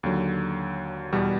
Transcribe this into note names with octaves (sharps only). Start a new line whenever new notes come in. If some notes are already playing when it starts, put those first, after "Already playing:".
D#2 D3 F#3
E2 B2 G3